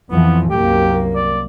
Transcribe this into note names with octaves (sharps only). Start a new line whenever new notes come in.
F2 E3 F3 B3
C2 F#2 A#3 G4
D5